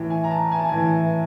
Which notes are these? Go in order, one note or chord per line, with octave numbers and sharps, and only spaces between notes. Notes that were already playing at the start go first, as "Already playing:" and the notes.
Already playing: A2 E3
G#5
A#5
A5
G#5
A5
A2 E3 G#5